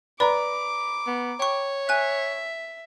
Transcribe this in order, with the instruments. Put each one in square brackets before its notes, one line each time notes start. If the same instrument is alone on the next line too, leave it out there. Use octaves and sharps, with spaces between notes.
[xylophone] B4 D5 [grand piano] A#5 B5 [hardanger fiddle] D6
[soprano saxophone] B3
[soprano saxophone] C#5 [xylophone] G5 C#6
[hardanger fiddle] E5 [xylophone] G#5 F#6